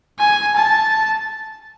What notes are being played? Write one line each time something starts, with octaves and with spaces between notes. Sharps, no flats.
G#5
A5